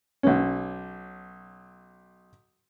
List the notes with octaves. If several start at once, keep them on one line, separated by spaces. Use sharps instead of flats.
B1 C#4